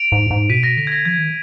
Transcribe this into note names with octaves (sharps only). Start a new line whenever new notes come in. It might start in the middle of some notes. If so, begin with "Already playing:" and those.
Already playing: D7 F7
G#2
G#2
B2 B6 D#7
A#6 D7
D3 A#6
G#6
A#6
F3 G#6
D#3